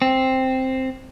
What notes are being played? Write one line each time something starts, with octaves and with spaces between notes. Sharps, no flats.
C4